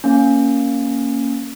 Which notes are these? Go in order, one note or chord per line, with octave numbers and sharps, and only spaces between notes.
A#3 C#4